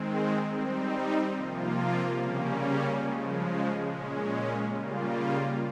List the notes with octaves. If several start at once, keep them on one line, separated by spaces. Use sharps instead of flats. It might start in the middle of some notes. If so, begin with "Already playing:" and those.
Already playing: D#3 G#3 C4
G3 C4 D#4
C3 F3 A#3 F4
C#3 G3 A#3 C#4
C#3 F3 G#3
A#2 G#3 C#4
C#3 G3 A#3 F4